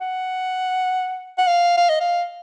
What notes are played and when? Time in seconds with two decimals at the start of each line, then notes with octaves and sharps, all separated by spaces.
0.01 F#5
1.38 F#5
1.47 F5
1.77 F5
1.89 D#5
2.00 F5